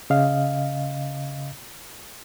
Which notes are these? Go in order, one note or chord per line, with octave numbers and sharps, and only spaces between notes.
C#3 D#5 F5